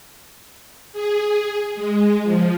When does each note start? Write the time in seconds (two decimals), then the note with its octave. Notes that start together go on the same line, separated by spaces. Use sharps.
0.93 G#4
1.75 G#3
2.24 F3